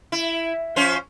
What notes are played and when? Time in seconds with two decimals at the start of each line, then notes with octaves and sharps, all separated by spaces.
0.12 E4
0.76 F3 C#4 C5